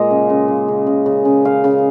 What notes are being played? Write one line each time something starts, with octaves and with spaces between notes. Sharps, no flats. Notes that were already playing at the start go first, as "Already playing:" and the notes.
Already playing: A#2 G#3 D#5 F5
C#3
C#3
C#3
C#3
C#3
C#3
C#3
C#3 F5
C#3